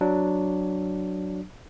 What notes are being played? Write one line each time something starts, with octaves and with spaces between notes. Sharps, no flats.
F#3 D4